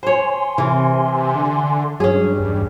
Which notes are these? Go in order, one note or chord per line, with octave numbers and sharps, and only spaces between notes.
C5 C#5 G#5 C6
C3 E3 A#4
D3
G2 F#3 C#4 G#4
E2